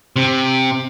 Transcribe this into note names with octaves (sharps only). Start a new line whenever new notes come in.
C3